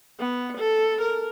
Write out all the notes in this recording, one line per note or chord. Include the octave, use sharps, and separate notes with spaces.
B3
A4
A#4